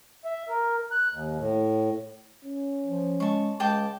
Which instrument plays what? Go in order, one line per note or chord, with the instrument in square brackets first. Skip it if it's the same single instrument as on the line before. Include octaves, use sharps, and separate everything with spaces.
[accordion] E5
A#4
F#6
D#2
A2
[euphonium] C#4
[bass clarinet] F3
[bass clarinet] G#3 [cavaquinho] A5 C#6
[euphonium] C#2 [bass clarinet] G#3 [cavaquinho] G5 A5 D6